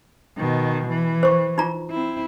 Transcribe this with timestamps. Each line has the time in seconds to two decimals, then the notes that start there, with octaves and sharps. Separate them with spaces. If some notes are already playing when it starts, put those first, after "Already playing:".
0.38 B2 D#3
0.89 E3
1.23 C5 C#6
1.58 D#4 F4 A#5
1.91 C4 E4